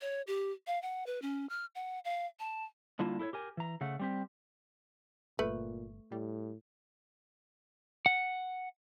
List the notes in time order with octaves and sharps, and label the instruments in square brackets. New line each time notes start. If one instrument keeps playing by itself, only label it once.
[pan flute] C#5
G4
F5
F#5
B4
C#4
F6
F#5
F5
A5
[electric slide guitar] D3 G3 A#3 E4 F4 A5
E4 A4 C5 C#5
G4 A#4 G#5
E3 A#5
C#3 A3 F#5
G3 C4 G4
[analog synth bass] G1 [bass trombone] A#2 [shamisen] A3 B4
[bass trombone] A2 [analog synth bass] G3
[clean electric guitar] F#5